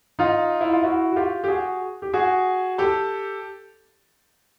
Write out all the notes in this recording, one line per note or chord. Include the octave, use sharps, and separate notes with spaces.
D#4 F4
E4
F4
E4 F#4
F#4
F4 G4
G4
F#4 G#4
G4
F#4 G#4
G4 A4